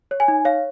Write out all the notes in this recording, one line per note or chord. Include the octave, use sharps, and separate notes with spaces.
C#5
G#5
D#4
C#5 F5